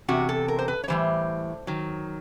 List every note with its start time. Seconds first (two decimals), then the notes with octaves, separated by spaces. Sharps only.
0.08 E2 C3 F#4
0.29 A4
0.48 A#4
0.59 C5
0.68 B4
0.84 C#5
0.88 A2 E3 G3 C5
1.67 D#3 F#3